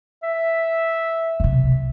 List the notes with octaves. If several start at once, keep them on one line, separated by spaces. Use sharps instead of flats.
E5
B1 C3